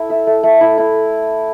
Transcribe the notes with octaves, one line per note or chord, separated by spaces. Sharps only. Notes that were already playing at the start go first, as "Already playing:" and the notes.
Already playing: E4 A4
E5
A3
A3
E4
E4